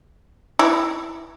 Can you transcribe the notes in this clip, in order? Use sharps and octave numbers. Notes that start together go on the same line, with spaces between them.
E3 E4